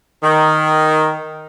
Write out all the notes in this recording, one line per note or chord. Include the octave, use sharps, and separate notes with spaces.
D#3